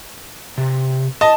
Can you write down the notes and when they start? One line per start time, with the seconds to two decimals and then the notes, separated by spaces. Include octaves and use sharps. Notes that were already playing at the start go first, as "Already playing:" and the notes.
0.58 C3
1.21 D#5 A5